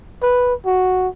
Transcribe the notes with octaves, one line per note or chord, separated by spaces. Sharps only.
B4
F#4